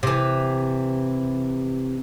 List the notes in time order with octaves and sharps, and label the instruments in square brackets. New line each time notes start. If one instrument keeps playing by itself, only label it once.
[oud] C3 E3